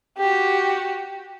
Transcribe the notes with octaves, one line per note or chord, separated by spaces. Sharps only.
F#4 G4